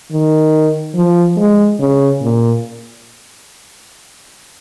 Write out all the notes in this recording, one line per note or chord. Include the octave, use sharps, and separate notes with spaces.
D#3
F3
G#3
C#3
A#2